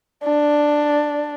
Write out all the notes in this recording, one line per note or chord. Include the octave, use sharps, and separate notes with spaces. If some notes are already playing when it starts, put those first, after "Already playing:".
D4